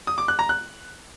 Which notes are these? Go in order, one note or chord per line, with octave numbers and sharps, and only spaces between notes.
D#6
D6
F#6
A#5
F#6